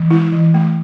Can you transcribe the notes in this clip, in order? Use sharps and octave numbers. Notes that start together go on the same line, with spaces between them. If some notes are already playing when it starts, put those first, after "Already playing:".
Already playing: E3
G#3 E4
E3
A3